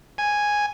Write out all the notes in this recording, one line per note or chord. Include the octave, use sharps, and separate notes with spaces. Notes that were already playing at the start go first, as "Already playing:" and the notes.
G#5